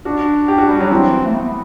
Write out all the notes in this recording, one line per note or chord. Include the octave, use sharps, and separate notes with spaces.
D4 F#4
G4
F#4
G3
F#3 D4
E3 C4
A3
B3